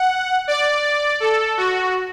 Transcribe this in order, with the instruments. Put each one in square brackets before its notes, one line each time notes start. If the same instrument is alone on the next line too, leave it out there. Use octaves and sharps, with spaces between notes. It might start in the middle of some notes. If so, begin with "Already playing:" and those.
Already playing: [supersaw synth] F#5
D5
A4
F#4